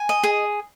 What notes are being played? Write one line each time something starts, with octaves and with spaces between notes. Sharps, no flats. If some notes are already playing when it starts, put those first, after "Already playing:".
Already playing: G#5
D#5
G#4